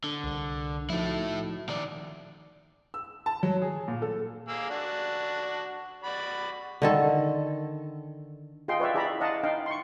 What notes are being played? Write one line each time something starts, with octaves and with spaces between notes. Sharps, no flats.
D3
C2
F3 A3 D#4 E4 F#4
D#3 D5
E6
A5
F#3
G#4
A#2
A4
A#3 G#4 E6
D4 F#4
F#4 D5 B5
D3 D#3 A4
F4 G#4 D#5 G5 C6
B4 C#5 D5 E5 G5
E4 G#4 D5 E5 A#5 B5
D5 D#5 F5 F#5 A5 A#5
D#4 F5 G5
C6 C#6